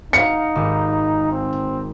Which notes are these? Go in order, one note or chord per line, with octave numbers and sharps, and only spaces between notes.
D#4 F5 F#5 C#7
G#1 G4
C4